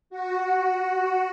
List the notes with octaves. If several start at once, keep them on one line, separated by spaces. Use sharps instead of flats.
F#4